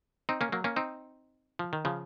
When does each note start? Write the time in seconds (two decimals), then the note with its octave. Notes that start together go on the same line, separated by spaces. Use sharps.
0.29 C4 D#4
0.41 A#3 C#4
0.52 F#3 A#3
0.64 A#3 C#4
0.76 C4 D#4
1.59 F3
1.73 D#3
1.85 C#3 F3